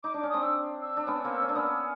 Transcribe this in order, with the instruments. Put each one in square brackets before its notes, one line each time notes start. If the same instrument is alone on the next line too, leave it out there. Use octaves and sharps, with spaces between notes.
[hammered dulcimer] D#4 [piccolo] D6
[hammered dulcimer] D4 [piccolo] D6
[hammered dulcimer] C#4
[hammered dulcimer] C4 D4 [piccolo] D#6
[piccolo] E6
E6
[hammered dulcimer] D4
B3 C#4
A#3 C4
C#4
D4
[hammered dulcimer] B3 C#4 [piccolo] D#6 E6